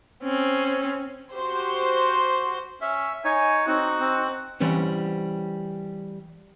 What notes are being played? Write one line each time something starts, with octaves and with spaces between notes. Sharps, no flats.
C4 C#4
F#4 G4 C5 C6
C#4 E5
D#4 C#5 G#5
C4 D#4 F#4
C4
E3 G3 C4 C#4